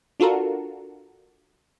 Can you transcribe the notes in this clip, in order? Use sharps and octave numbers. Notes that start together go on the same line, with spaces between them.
D4 F4 F#4 A4 A#4